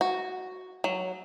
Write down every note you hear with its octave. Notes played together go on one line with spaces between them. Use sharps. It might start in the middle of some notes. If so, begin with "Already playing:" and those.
F#4
F#3